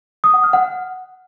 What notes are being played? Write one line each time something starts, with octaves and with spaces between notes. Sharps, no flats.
D#6
F#5
F6
F#5